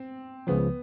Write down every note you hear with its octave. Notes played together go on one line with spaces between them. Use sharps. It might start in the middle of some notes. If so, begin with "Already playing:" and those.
Already playing: C4
C#2 C#3 F3 B3